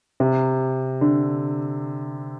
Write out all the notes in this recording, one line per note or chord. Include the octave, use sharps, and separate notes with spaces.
C3
D3